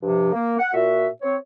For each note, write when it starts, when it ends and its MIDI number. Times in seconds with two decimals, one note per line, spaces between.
0.03 0.31 43
0.03 0.31 48
0.03 0.31 53
0.32 0.58 58
0.58 0.73 78
0.74 1.07 46
0.74 1.07 66
0.74 1.07 76
1.22 1.35 60
1.22 1.35 73